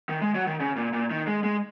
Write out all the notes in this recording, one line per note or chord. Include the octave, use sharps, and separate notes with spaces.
D#3
G#3
F#3
D#3
C#3
A#2
A#2
D#3
G#3
G#3